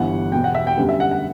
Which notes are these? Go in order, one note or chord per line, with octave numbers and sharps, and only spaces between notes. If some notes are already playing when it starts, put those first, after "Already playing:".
Already playing: G1 G2 E3 F#5
E1 E2 B2 G5
F#5
E5
G5
F#2 D3 G3 B3
E5
F#5
F#5